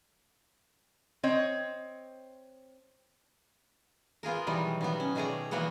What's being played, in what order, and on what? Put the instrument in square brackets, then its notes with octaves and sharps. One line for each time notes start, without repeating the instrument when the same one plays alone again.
[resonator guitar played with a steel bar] C4 C#5 D#5
[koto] B3 F4 G#4 A#4
B2 D#3 E3 F#3 G3
D#3 F#3 B3
C#4
B2 D#3 A3 G#4 D5 A#5
E3 F#3 A#3 B3 F#5